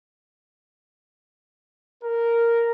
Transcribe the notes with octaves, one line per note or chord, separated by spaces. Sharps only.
A#4